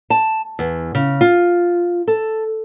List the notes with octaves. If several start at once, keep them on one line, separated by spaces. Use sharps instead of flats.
A5
E2
C#3
F4
A4